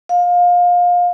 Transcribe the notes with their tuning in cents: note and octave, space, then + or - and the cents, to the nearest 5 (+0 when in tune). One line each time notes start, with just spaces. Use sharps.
F5 +25